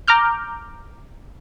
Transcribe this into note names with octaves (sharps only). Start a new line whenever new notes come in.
A#5 D6 F6 G6